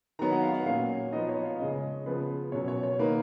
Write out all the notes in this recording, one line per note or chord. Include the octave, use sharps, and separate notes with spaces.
D#3 F#3 B3 D#4 A#5
F#5
F5
F5
A#2 F#3 C#4 F5
F3 B3 D#4 D#5
C#5
F5
C#3 G#3 C#4 D#5
C#3 F3 B3 B4
B2 F#3 C#4 C#5
C#5
C#5
D#3 A#3 D#4 B4